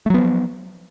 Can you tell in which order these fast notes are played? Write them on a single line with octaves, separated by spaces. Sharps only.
A3 F#3 B3 F3